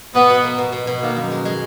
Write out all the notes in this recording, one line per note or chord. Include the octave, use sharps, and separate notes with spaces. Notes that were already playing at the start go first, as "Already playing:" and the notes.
B2 B3
B2
A#3
B2
B2
B2
D#3 A#3
F#2
G#3
G#3